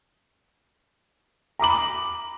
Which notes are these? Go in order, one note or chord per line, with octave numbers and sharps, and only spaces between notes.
A#5 B5 D6 F#7